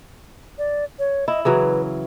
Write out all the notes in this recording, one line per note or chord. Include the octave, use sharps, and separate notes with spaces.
D5
C#5
E4 D#5
C#3 E3 F#3 B4